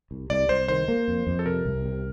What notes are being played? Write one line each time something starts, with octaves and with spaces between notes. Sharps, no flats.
C2
C2 D5
C2 C5
D#3 C5
A#3
F2
F2
A4
C3 A#4
C2
C3